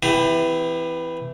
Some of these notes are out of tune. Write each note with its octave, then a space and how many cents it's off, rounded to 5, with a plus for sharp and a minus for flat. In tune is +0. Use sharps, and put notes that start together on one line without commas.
E3 +0 C4 -30 G4 +30